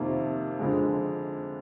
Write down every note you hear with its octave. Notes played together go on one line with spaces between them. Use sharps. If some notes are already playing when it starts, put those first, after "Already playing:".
Already playing: F2 C3 D#3 A#3
F2 D3 G#3